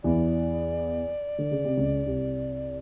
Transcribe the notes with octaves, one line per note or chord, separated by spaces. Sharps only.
E2 E3 D5
D3
C#3
C3
C#2 C#3
C2 C3